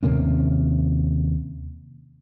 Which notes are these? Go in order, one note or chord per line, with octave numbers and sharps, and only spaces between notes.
D#2 C3 A#3 C#4